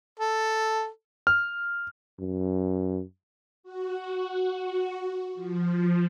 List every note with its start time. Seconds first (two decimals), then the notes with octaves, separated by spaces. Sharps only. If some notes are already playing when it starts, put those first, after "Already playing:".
0.20 A4
1.27 F6
2.19 F#2
3.63 F#4
5.35 F3